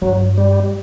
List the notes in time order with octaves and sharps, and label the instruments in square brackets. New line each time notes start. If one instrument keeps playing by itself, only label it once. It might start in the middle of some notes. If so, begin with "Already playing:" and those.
[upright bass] G2 [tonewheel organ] F#3
[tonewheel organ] G3